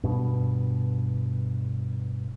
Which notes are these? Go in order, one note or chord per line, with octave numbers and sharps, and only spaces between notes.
G2 B2